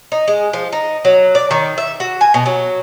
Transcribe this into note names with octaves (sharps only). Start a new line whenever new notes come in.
D#4
G#3
F3
D#4
F#3
D5
D#3
E5
F#4
G#5
B2
F#3